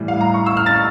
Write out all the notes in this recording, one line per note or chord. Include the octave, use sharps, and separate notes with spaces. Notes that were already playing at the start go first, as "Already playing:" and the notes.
Already playing: A2 E3 G3
F5
A#5
C#6
E6
F6
A6